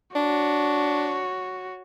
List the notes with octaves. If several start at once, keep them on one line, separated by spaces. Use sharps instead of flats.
D4 F#4 C#5